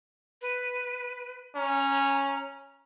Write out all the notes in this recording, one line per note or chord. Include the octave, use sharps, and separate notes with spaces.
B4
C#4 A#5